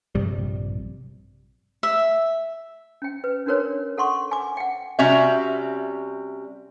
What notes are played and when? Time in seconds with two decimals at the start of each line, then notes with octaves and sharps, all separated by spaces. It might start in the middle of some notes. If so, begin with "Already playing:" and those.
0.15 A#1 G2 C3 G3
1.83 E5
3.02 C#4 G5
3.24 B4
3.46 C#4 D4 F#4 A#4 B4 C#5
3.98 A4 F#5 C6 C#6
4.31 G#5 D6
4.57 F#5 G5
4.99 C3 G3 C#4 F#4 E5